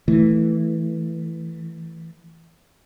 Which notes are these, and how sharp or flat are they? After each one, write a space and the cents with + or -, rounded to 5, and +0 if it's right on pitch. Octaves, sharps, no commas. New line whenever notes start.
E3 -5 A3 +5